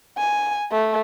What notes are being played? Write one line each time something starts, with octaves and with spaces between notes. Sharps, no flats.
G#5
A3